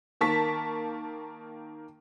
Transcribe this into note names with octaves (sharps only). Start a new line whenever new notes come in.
D#3 A#3 A5 C#6 B6